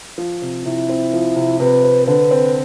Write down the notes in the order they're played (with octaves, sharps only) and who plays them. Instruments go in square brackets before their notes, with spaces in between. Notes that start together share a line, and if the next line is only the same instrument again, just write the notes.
[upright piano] F3
C3
[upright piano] C3 [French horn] E4
[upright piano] C4
F3
C3
[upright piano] C3 [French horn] B4
[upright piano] C4
[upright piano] D3 [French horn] B4
[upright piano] C4